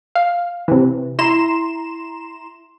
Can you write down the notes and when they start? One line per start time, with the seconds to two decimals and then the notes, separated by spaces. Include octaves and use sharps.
0.15 F5
0.68 C3 E3
1.19 E4 A#5 C6 E7